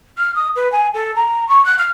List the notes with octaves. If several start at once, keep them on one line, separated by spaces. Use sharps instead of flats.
F6
D#6
B4
G#5
A4
A#5
C#6
F#6
F6